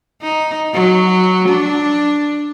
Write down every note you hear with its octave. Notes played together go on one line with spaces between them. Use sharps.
D#4
F#3
D4